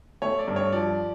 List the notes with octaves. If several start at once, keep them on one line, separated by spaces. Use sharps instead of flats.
A3 C#5
D5
G2
C#5
F3 D5